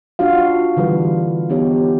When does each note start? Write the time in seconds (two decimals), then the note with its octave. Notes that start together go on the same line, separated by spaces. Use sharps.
0.19 D4 F4 F#4 F5
0.77 D3 E3 G3 A4 B4
1.50 B3 D#4 G4 C#5